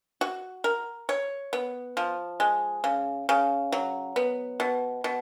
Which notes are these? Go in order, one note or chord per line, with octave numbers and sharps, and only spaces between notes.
F#4
A#4
C#5
B3
F3
G#3
C#3
C#3
F#3
B3
B2
B2